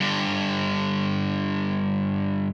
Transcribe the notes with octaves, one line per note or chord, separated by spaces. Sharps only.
G2 D3